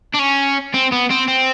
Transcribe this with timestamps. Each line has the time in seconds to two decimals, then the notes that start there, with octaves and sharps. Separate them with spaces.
0.15 D4
0.19 C#4
0.74 C4
0.92 B3
1.10 C4
1.28 C4